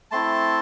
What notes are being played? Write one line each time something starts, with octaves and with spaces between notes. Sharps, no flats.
A3 C4 E4 A5 C6